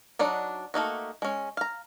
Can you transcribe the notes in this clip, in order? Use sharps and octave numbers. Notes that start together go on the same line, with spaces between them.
F#3 D4 D#4 D5 F#5
A3 A#3 D#4 F#4
G#3 C#4
F5 A#5